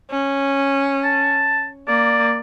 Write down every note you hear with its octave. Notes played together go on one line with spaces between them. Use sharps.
C#4
A5
A#3 D5